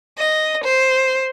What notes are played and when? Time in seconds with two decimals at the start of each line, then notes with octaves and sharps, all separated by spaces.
0.18 D#5
0.64 C5